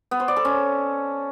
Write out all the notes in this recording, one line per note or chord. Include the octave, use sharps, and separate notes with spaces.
B3
C5
D5
A4
C#4